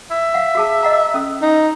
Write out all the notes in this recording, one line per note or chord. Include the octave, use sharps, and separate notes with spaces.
E5
F5 F#5
F#4 G#4 A5
D#5 F#5 A#5
C#4 A4 E6
D#4